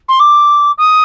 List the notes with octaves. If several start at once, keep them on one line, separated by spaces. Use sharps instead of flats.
C6
D6
D#6